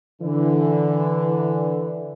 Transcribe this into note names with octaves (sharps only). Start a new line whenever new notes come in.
D3 E3